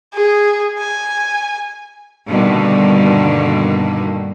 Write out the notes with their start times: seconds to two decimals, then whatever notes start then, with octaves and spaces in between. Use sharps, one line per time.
0.14 G#4
0.78 G#5
2.28 G2 B2 D3 D#3 A#3